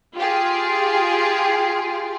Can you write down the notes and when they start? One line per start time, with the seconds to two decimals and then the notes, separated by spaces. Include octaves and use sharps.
0.15 F4 G4 G#4